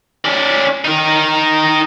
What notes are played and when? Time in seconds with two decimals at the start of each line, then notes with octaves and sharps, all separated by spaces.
0.25 C#4 D5
0.85 D#4 A#4